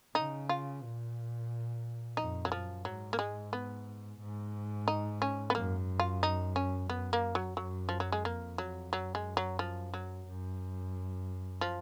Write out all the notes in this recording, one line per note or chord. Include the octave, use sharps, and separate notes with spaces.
C#3 D#4
F4
A#2
F2 D#4
F#3
F#2 F3
G#2 F#3
A#3
G#3
B3
G#2
D#4
C#4
B3
F#2 A#3
F4
D#4
C#4
F#2 B3
A#3
F#3
F#2 F#3
F3
F#3
G#3
F2 A#3
F#3
F#2 F#3
G#3
F#3
F3
F#3
F#2
F3